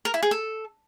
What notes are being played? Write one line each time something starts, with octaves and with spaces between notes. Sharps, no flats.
A#4
E4
G#4
A4